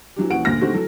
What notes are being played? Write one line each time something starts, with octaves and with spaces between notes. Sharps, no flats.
E3 F#3 D4 G4
D#1 E3 C#4 F#4 F#5 D7
D2 A#2 D3 F6 A#6
D3 D#3 A3 C4 F#4 G4
E3 F#3 A4